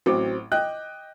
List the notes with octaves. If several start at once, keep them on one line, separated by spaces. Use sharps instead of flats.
A1 F#3 C4 D6
D#5 G5 F#6